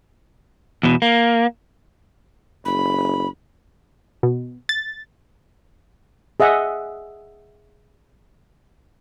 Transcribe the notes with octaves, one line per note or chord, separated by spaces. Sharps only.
E2 B2
A#3
F#1 B5
B2
A6
G#4 D#5 E5 F#5 G#5